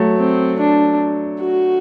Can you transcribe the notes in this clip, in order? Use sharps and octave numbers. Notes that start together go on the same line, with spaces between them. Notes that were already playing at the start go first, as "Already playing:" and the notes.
Already playing: F#3 A3
C4
D4
F#4